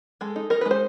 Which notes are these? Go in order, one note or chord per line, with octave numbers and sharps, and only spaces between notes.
G#3 A4
D#4
D#4 A#4
B4
G#3
C5